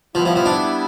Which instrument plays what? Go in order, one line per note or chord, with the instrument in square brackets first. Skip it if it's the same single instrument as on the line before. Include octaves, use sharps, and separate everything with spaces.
[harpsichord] F3 [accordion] G3 B3 E4
[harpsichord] F3
F3
D4